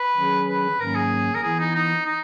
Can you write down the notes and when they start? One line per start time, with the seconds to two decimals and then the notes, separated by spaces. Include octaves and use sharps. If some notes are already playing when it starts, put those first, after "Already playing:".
Already playing: B4
0.17 D#3 F#3 C#4 G#4
0.48 B4
0.79 G#2 D#3 F#3 A#3 C#4 A#4
0.95 G#4
1.35 A#4
1.43 E3 B3 E4 G#4
1.59 D#4
1.75 D#4
2.06 D#4